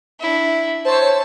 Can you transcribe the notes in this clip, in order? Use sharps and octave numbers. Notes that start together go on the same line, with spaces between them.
D4 E4
C5 C#5 A5 E6